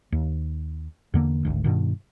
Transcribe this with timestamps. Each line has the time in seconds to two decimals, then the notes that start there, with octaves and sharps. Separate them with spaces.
0.12 D#2
1.14 E2 D3 A#3
1.45 G#1 D2
1.64 G2 B2 D#3